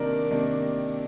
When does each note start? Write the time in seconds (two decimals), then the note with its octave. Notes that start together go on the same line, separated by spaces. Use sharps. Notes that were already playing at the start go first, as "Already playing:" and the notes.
Already playing: C3 D#3 A#3 D4 A#4 D5
0.31 C3 D#3 A#3 D4